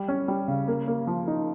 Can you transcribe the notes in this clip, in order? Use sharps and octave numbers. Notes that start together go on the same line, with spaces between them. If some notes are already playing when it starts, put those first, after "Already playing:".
Already playing: G3
C#4
G3
C#3
A#3
A#3
F3
D#4